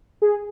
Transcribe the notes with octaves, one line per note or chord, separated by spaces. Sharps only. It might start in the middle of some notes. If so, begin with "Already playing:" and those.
G#4